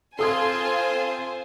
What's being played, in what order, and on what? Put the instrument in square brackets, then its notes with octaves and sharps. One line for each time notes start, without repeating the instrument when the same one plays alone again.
[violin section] C4 F4 C6 [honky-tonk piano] A4 D#6 G#6 [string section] C5 G#5